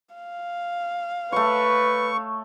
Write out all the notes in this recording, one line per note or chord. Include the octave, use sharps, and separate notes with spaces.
F5
A3 B4 C#5 C#6